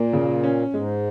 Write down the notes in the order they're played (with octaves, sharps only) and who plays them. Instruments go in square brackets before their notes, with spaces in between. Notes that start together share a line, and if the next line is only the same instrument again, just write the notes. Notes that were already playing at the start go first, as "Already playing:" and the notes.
Already playing: [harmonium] A#2 [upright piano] A#3
[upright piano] C#3
C#4
[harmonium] G#2 [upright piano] G#3